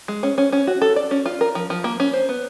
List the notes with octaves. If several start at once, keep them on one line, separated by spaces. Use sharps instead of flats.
G#3
C#4
C#4
C#4
F#4
A4
D5
C#4
F4
A#4
F3
F3
A#3
C#4
C5
B3